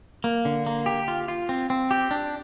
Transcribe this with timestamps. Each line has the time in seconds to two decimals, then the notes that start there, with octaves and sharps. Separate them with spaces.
0.24 A#3
0.45 D3
0.66 A#3
0.86 G4
1.08 F4
1.28 F4
1.49 C4
1.70 C4
1.91 G4
2.11 D4